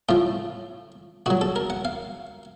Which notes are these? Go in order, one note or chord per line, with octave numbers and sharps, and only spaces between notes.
A2 F3 F4
A#2 F#3 F#4
A4
A#4
F#5
F5